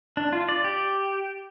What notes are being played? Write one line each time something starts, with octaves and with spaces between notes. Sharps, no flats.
D4
F4
D5
G4